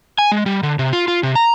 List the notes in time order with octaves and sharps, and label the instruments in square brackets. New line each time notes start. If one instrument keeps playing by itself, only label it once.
[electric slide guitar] G#5
G#3
G3
D3
C3
F4
F4
C3
A#5